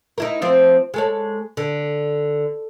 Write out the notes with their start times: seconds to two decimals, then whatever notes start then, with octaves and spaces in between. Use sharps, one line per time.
0.18 D#4 E4 A#4
0.42 F3 C4
0.94 G#3 A4 C#5
1.57 D3